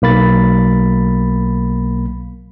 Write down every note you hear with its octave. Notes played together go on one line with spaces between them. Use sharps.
B1 A#3 B5 A6